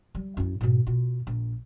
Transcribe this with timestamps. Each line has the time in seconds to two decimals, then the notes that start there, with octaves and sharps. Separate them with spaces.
0.15 G3
0.37 F#2 E4
0.61 G#2 B2
0.87 B2 F4
1.27 A#1